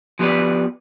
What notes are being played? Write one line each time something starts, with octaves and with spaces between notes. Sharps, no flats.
F3 B3 G4 A4 B4 D5